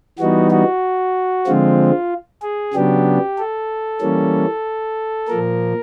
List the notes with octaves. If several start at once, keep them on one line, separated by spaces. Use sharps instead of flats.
E3 G3 B3 D#4 F#4
F#4
D3 F3 G#3 C4 F4
G#4
C#3 F#3 B3 D4 G4
A4
E3 G3 A#3 C#4
A#2 F3 A#3 A#4